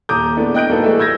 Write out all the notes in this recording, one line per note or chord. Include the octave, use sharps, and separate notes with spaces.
D#1 A#5 D6 D#6 G6
G#3 A3 B3 D4 E4
D#5 G5 F#6 G6 D7
D1 A#3 D#4 A4 B4
E3 G3 A3 G#4 D#5 E5
E6 G6 G#6 A#6